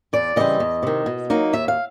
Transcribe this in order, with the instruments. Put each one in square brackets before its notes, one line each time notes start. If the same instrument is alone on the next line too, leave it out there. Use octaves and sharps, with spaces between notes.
[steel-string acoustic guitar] E2 D5
C#3 E3 G3 C4 D#5
E2
C3 D#3
B2
F#3 A#3 D#4
D#2 E5
F5